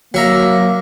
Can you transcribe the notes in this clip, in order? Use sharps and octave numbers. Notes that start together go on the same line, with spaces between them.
F#3 A#3 E5 A#5